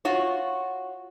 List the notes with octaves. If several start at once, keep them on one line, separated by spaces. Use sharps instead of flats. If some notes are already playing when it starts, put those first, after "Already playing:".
F4 F#4 C#5